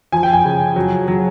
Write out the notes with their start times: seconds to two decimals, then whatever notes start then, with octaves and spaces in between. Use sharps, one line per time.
0.12 F3 G#5
0.23 G5
0.33 G#5
0.45 C#3
0.76 F#3
1.08 F#3